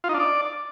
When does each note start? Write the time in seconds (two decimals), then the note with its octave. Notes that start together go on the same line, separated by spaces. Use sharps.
0.04 F4
0.09 D#4
0.14 D4
0.19 D5